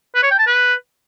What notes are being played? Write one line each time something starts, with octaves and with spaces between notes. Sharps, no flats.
B4
C#5
G5
A5
B4